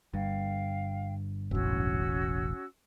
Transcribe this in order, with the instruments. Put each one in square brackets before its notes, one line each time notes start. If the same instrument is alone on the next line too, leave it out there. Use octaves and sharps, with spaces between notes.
[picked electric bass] G1 G2 [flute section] F5 G5
[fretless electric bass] E1 A1 [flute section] C#4 F#4 E6